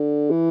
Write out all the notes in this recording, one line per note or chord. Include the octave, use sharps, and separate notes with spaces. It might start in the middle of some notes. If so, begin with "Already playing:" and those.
Already playing: D3
E3